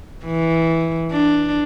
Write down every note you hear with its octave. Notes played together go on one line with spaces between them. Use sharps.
E3
D4